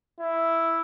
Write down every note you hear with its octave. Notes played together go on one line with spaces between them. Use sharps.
E4